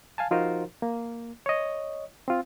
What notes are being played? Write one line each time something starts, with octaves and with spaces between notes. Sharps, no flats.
F5 G#5 A5
F3 D#4 F4 F#4 A#4 C5
A#3
C#5 D#5
C4 F4